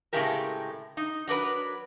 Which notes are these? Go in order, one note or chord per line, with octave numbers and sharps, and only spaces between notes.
A2 C#3 G#3 A3 G4 A#4
D#4
F#3 D4 A#4 B4